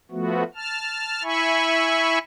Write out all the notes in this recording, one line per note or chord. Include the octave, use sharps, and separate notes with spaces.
F3 A3 B3 F#4
A5 F6
E4 E5 G#5 B5 C#6